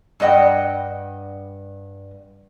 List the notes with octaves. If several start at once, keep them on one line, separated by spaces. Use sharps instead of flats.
G2 G3 D#5 F#5 G5